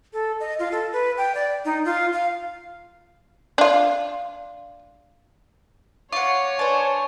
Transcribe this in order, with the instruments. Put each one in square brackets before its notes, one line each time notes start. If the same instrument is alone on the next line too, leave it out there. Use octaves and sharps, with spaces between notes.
[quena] A4
D#5
F4
A4
B4
G5
D5
D#4
F4
F5
[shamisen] D4 F4
[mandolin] F4 F#5 [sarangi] C#5 [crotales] C#6 [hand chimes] D6
[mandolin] D4 C5 [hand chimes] B4 D5 G#5